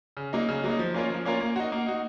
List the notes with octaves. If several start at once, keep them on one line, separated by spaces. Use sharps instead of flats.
C#3
F#3 A#3 D#4
C#3
F#3 A#3 D#4
F3
A#3 C#4 F4 A#4
F3
A#3 C#4 F4 A#4
A#3
D#4 F#4
A#3
D#4 F#4